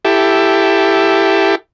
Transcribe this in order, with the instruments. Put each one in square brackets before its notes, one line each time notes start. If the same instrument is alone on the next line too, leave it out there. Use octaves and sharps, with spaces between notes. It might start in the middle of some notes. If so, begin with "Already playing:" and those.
[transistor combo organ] E4 G4 A4